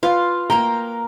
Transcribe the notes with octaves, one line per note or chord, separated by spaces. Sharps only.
F4 B4 F5
A#3 A#4 G5 A#5